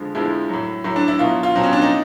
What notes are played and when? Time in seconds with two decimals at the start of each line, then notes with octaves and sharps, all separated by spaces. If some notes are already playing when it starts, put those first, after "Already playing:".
Already playing: F2 D3 F3 G#3
0.14 F2 D3 F3 G#3 E4
0.49 A2 F#3
0.84 A2 F#3 E4
0.96 D4
1.08 E4
1.19 B2 F#3 F4
1.43 F4
1.55 B2 F#3 C4
1.63 C#4
1.73 D4
1.82 D#4